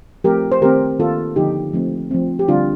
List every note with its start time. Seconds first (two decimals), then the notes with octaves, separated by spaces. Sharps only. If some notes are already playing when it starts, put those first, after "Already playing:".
0.24 F3 A3 C4 G4 A#4
0.52 C5
0.62 D#3 A3 C4 G4 A#4
0.99 D#3 A#3 F4 A4
1.36 D3 F3 A#3 D#4 G4
1.73 F3 A3 C4
2.11 F3 A3 C4
2.39 G4
2.48 D3 G3 C4 D4 F4